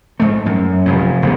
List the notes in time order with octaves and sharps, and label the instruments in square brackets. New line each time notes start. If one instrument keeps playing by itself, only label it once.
[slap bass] G#2 A3
F#2
F1 G#2
F1 D#3 B3